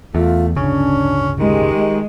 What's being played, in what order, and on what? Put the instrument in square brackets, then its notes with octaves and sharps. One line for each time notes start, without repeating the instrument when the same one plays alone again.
[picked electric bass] E2 [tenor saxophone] A3 [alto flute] F4
[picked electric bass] D1 G1 C#3 [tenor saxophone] C#4 [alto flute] D4
[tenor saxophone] D#3 [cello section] G#3 [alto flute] G4